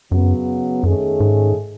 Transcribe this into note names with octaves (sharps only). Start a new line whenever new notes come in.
F#2 C#3 F#3 B3
F#2 D#3 A3 C#4 G#4
G#2